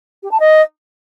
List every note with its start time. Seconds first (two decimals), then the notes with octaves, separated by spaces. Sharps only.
0.23 G4
0.31 A5
0.40 D#5